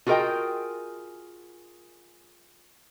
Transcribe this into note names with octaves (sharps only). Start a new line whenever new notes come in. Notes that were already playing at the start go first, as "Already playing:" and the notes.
F4 F#4 G#4 A#4 D#5 G5